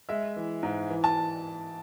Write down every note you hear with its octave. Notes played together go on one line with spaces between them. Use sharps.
G#3 E5
E3
G#2
E3
A5